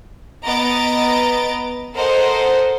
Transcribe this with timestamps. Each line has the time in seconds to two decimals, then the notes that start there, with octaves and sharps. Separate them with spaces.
0.45 B3 D#5 A#5 A6 D7
1.95 A4 A#4 C5 D#5 F#5